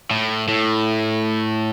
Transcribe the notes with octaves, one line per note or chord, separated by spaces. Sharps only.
A2
A2